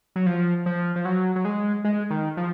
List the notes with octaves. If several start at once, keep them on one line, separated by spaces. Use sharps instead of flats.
F#3
F3
F3
F3
F#3
F#3
G#3
G#3
D#3
F3